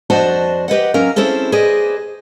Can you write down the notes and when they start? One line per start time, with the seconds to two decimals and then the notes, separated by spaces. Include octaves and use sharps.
0.10 F2 D4 F#4 C5 D#5 A5
0.68 G4 B4 D#5 F#5
0.94 F#3 C#4 A#4 F5
1.16 C4 C#4 E4 G#4 A4 C5
1.52 G#4 B4 C5 D5 D#5